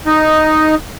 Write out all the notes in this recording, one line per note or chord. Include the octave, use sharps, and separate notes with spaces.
D#4